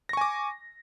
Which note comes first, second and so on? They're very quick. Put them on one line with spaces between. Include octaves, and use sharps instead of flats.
A#6 C#6 G#5 D6